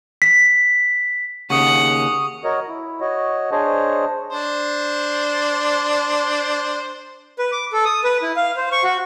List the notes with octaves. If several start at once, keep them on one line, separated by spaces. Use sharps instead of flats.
B6
D#2 C#3 F#5 C#6 D#6
F#4 A#4 C#5 D#5
E4
F#4 C#5 D#5
D4 G#4 C5 C#5 D#5
D4 C5
B4
D6
A4
D#6
B4
E4
F5
C5
C#6
F#4